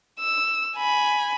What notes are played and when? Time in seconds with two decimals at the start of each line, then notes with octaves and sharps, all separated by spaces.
0.20 E6
0.76 G#5 B5